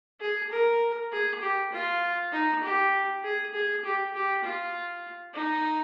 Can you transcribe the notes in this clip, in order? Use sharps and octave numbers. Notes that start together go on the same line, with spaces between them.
G#4
A#4
G#4
G4
F4
D#4
G4
G#4
G#4
G4
G4
F4
D#4